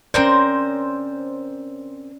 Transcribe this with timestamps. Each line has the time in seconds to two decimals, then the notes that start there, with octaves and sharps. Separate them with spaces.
0.14 C4 C#4 A#4 C5 D5